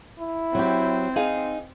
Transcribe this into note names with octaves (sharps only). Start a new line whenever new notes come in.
E4
F#3 C4 G4
D#4 G#4 F5